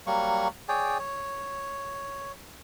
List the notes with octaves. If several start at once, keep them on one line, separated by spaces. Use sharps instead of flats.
F#3 G3 A#3 C#6
G#4 C#5 D5 G5
C#5